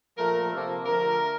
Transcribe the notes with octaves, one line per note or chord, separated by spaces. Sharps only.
A#2 F3 A3 A#4
C3 F3 A#3 A4
D3 F3 A3 A#4